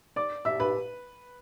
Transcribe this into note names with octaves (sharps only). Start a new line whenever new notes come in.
D5 D6
E5 E6
B4 B5